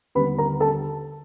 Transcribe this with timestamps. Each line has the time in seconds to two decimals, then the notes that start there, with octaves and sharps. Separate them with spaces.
0.15 D#2 D3 G3 B3 B4 B5
0.38 A#4 A#5
0.60 A4 A5